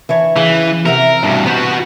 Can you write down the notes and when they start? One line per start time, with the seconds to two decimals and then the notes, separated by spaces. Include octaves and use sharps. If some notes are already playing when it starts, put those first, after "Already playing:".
0.09 E3 D4 C#5
0.36 C#3 E3
0.86 C3 A#4 E5 F#5
1.23 G2 B2
1.46 B3 F#4 G4 C5